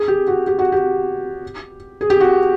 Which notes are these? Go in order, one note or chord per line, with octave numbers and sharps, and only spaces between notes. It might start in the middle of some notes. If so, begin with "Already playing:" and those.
Already playing: G#4
G4
F#4
G4
F#4
G4
G#4
G4
F#4